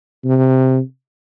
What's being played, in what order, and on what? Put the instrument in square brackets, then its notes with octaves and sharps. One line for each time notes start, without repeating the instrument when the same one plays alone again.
[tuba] C3